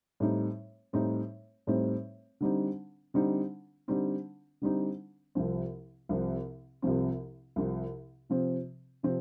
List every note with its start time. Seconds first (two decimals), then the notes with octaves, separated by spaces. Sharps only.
0.20 A2 G3 C4 D#4
0.93 A2 G3 C4 D#4
1.67 A2 G3 C4 D#4
2.41 D3 G3 C4 D#4
3.14 D3 G3 C4 D#4
3.88 D3 G3 C4 D#4
4.62 D3 G3 C4 D#4
5.35 C2 C3 F3 C4
6.09 C2 C3 F3 C4
6.82 C2 C3 F3 C4
7.56 C2 C3 F3 C4
8.30 C3 F3 C4
9.03 C3 F3 C4